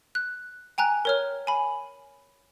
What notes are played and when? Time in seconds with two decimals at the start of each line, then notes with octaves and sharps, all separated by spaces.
0.15 F#6
0.78 G5 G#5 A#5 F#6
1.05 A#4 C#5 F6
1.47 G#5 B5